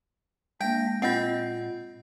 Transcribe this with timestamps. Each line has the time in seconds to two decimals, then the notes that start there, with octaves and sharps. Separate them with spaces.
0.61 G#3 A#3 D4 E5 G5 G6 A#6
1.02 A#2 C4 F4 D#5 F#5 G6